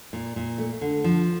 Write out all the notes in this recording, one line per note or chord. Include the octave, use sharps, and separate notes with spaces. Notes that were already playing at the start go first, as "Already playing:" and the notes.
A#2
A#2
A3
D3
F3